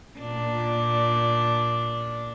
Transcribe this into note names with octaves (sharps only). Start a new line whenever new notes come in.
A#2 D4